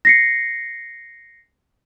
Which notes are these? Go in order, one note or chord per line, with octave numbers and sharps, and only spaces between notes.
A#6 C7 C#7